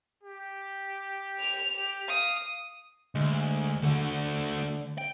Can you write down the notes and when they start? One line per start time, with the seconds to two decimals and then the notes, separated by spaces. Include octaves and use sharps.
0.23 G4
1.38 F7
1.77 G4
2.08 F5 D#6
3.15 D2 G#3
3.83 D3 A3 F#4
4.98 G5